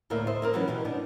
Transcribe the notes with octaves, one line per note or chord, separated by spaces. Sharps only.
D2 A2 A#3 A#4 E5
A4 C5 D#5 E5
A#3 C4 A#4
E3 F#3 B3 C#4 E4 G4
B2 E3 G4
B3 D4 D#4